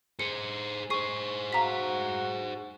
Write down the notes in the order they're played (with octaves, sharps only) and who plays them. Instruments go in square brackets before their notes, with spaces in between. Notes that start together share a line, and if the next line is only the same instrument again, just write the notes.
[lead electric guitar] G#4 C5 [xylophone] C#7
[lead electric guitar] G#4 C5 [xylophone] C#6 C7
[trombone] F#4 [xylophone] F5 A#5 B6